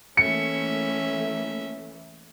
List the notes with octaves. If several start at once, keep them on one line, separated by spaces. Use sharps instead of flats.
E3 A3 A#3 C#4 E5 C#7